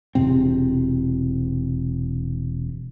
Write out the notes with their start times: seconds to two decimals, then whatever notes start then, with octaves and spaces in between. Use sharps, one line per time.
0.15 E1 C3 C4